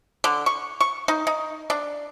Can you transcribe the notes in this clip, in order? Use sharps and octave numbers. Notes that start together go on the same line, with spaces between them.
D3
C#6
C#6
D#4
D#4
D4